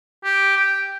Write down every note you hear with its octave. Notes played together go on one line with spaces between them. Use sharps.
G4
G5